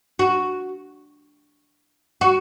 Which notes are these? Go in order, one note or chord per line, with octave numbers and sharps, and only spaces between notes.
F#4
F#4